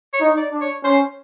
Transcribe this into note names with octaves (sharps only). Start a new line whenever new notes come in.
C#5
D#4
D5
D4
C#5
C#4 C5